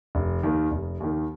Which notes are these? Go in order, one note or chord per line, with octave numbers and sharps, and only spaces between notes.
F1
D#2 D#3
F1
D#2 D#3